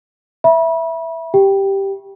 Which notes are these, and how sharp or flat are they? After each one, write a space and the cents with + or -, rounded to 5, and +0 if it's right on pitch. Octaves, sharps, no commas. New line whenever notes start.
E5 +0 B5 -35
G4 +0 G5 +0